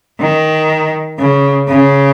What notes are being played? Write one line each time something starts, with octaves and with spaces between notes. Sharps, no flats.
D#3
C#3
C#3